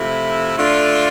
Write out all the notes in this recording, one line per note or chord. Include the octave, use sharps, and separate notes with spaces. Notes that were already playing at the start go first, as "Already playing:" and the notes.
Already playing: C3 F3 A3 E4
D3 A3 D4 F4